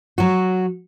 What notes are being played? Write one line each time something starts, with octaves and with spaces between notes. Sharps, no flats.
F#3 F#4